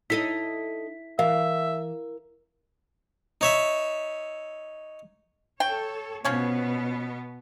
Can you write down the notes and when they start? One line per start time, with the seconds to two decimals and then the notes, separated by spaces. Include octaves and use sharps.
0.10 D#4 E4 A4 D#5 B6
1.19 E3 A#4 E5 F5
3.41 D#4 C#5 E5
5.60 A4 C#5 G5
6.25 B2 F3 B3 C#4 C#5